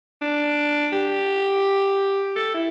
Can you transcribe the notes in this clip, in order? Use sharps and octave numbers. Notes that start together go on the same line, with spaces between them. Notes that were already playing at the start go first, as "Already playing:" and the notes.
D4
G4
A4
E4